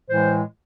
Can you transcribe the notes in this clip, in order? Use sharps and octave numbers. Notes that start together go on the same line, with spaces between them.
A2 E3 G#3 C5